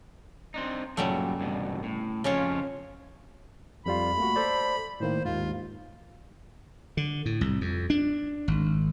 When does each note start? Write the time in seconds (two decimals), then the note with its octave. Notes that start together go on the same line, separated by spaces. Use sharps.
0.54 C4 D4 D#4
0.97 G2 A#2 C#3 F#3 G3 A3
1.40 C2 G2 B2
1.83 A2
2.24 F2 C#3 F3 C#4 F4 C#5
3.86 F2 G3 F4 B5
4.18 A3 A#3 F#4
4.36 A4 C5 D5
5.00 A2 D#3 A#3 C5
5.25 D#2 G#2 F4
6.97 D3
7.26 A2
7.41 C2
7.61 F2
7.90 D4
8.48 G#1